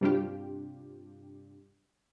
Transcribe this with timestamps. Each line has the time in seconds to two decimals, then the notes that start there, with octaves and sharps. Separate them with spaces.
0.01 G2 C3 G3 D4 F4 G4